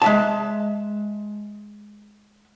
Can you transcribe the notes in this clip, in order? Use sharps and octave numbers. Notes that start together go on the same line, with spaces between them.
G#3 E5 A5